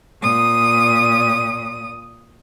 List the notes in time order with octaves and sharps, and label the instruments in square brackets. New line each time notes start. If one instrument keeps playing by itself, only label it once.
[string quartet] A#2 D#6